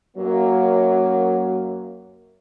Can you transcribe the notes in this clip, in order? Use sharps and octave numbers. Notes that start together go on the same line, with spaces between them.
F#2 F#3 A#3